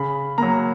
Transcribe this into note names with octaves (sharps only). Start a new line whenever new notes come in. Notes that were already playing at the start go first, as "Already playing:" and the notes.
Already playing: C#3 B5
F#3 A#3 A#5